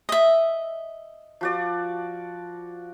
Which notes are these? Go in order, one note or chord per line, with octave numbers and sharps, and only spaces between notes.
D#5 E5
F3 F#4 D5